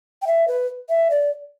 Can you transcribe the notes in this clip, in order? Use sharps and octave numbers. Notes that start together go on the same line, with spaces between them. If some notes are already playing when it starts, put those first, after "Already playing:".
G5
E5
B4
E5
D5